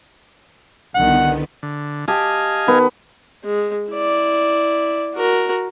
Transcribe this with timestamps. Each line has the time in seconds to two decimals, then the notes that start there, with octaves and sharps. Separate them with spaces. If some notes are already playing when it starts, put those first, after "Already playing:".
0.95 C2 D3 D#3 B3 F#5
1.63 D3
2.08 G4 D#5 F5 G#5 A5
2.67 D#3 B3
3.44 G#3
3.91 E4 D5
5.15 F#4 A#4